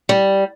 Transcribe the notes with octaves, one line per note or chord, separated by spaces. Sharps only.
G3